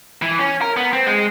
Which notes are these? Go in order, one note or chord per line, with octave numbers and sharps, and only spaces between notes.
E3
C#4
A#4
B3
C4
G#3